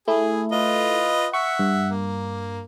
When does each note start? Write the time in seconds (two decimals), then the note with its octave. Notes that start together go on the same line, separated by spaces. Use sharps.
0.08 A3 E4 G#4
0.52 F4 B4 D#5
1.34 E5 F#5 C#6
1.59 G2
1.90 A#3